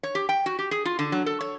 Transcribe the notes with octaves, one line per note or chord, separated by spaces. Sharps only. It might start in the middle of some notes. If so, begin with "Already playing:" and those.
C#5
G4
G5
F#4
G4
G#4
F4
D3
F#3
A4
C#5